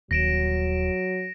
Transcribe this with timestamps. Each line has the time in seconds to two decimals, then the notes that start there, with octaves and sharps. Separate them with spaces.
0.11 D#1 F#3 A#6 D7 E7